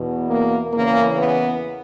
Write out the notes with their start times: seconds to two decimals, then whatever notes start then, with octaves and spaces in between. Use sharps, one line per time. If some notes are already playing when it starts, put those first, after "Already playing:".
Already playing: E2 B2
0.28 A#3
0.73 E2 C#3 E3 A#3
1.18 B3